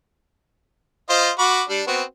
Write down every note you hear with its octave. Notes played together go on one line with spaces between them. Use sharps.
F4 C5 D#5
F#4 B5 D6
G3 D4
B3 C4 F#4